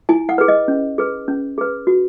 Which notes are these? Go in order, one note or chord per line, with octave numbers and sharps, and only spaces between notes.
E4 G#5
F#5
G#4 B4
D#5
C#4
G#4 B4
C#4
G#4 B4
F#4